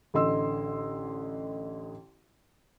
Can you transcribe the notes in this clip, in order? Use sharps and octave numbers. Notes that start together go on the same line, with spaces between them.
A1 D3 D#5 C6 E6